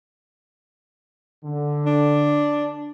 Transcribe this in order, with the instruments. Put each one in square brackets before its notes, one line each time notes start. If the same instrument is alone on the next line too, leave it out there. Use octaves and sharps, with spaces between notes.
[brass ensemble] D3
[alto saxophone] D4